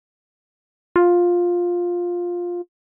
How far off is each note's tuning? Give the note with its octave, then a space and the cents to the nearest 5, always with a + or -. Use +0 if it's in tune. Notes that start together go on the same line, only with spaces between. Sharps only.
F4 +10